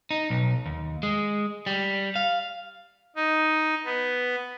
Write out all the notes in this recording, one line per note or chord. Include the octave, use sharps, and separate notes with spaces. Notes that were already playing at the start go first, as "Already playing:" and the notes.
D#4
B1
D#2
G#3
G3
F5
D#4
B3